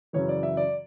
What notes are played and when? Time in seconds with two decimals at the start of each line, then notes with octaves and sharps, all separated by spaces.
0.13 F#2 C#3 E3 C#5
0.29 D5
0.43 E5
0.57 D5